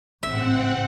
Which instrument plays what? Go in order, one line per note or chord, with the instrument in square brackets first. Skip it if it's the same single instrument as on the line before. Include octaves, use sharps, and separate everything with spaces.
[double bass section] A1 G#2 C#3 [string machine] C4 F#5 [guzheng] E5